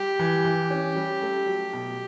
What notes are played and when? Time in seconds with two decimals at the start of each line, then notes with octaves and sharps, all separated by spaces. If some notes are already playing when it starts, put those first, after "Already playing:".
Already playing: G3 G4
0.19 E3
0.45 E3
0.70 C#4
0.96 G3
1.22 A3
1.47 F#3
1.73 B2